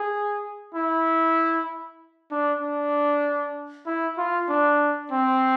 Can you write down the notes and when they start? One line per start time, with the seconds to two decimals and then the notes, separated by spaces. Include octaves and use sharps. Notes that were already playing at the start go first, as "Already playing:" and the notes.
Already playing: G#4
0.75 E4
2.31 D4
2.62 D4
3.86 E4
4.18 F4
4.49 D4
5.11 C4